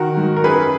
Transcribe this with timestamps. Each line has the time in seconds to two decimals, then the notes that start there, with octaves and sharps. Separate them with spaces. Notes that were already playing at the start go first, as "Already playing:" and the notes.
Already playing: D#3 F#4 A#4
0.17 G#2
0.37 A#4
0.44 F#2 G#4 B4